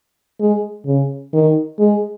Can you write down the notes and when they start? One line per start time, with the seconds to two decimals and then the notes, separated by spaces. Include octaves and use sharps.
0.40 G#3
0.86 C#3
1.33 D#3
1.79 G#3